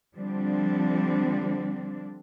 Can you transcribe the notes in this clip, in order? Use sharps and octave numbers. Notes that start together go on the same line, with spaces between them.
D3 F3 G3 C4 D4